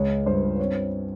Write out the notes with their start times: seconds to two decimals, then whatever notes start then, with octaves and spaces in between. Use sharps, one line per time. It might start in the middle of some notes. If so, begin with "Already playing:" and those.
Already playing: C#2 G#3 C#5
0.26 G2 C5
0.59 C4 C#5